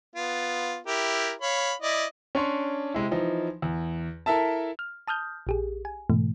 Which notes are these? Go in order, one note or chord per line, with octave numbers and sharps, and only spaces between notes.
B3 F4
E4 G4 A#4
C#5 F5 B5
E4 D5 D#5
C#4 D4 C#5 C6
C3 G#3 E4
E3 F3 D#4
E2
E4 A4 A#4 E5 A5
F6
A5 D#6 F6 G6
A#1 G4 G#4
G#5
G#2 B2 E3 A3